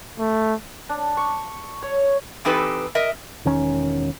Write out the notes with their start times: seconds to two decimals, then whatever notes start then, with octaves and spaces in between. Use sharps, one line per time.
0.19 A3
0.89 D4
1.17 C#6
1.82 C#5
2.45 E3 C4 D#4 G4 A4 B4
2.95 A#4 D#5 E5
3.45 E1 D#3 C#4